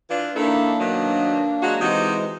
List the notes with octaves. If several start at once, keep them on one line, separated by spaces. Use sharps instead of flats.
E3 D4 F4
D#3 A#3 D4 E4 A4
B2 D#3 F#3
F#3 G#3 F#4
C3 E3 G#3 D#4 F#4 C5